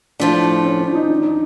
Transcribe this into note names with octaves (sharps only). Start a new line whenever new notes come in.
A2 F3 A3 D4
C#4
D4
D#4
D4
D#4